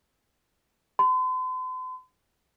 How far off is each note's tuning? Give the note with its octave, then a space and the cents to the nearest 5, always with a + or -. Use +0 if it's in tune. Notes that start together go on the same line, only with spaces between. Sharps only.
C6 -45